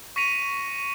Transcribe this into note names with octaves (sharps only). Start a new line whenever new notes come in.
C#6 A#6 B6 C#7 D#7 F7